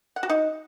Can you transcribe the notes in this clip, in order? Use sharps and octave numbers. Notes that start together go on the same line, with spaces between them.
F#5
F#4
D#4